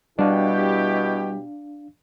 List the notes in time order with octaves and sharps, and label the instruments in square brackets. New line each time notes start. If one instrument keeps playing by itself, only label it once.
[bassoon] B2 [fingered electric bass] G3 [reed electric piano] D4 F5 [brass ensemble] E4 G4